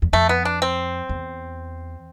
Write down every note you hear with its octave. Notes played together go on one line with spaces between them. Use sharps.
E2
F2 A3
B3
D4
C4
E2